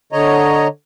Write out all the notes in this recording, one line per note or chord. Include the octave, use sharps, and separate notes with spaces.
D3 C#5 D#5 A#5